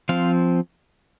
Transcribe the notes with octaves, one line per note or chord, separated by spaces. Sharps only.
F3 C4 F5